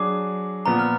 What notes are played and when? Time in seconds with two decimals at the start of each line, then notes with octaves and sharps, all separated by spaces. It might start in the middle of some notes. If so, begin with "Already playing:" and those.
Already playing: F#3 D4 G#4 D6
0.66 A#2 F3 B3 A#5
0.79 F6